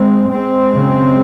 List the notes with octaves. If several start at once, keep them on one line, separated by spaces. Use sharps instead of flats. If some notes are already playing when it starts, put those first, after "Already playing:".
Already playing: G#3 C4
G#3 C4
F#2 C#3